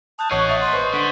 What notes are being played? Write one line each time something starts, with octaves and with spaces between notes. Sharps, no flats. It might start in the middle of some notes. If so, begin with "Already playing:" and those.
A5 D#6 F#6 G6
A1 C#5 D#5 F#5 C#6 G#6 C7 F#7
E5 D#6 A6
C6
B4 C5 C#6
D3 C6 B6 F#7